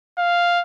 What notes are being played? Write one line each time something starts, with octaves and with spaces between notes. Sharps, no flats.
F5